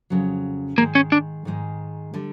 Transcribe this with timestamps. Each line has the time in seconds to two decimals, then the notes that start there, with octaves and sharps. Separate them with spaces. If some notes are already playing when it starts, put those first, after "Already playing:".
0.10 F2 C#3 F#3
0.78 G#2 D#3 G#3 A#3
0.95 C#4
1.12 D4
1.45 G#2 D#3 G#3
2.14 D3 G3